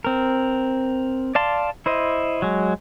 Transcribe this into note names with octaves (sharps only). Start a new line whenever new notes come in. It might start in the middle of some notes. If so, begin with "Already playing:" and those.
C4 A#4
D5 F5 A5 C6
E4 C5 D#5
F#3 G#3